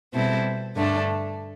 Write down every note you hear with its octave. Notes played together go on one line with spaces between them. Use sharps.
B2 G3 C4 E4 A4
G2 D3 A3 D4